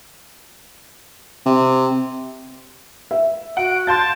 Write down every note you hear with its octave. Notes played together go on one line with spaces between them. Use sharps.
C3
E5
F#4 F#5 D7
F5 A5 C6 G6 A6